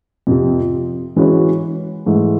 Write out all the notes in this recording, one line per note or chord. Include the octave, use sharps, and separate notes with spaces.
F2 C3 F3
E3 G#3 C#4 F#4
G#2 E3 A3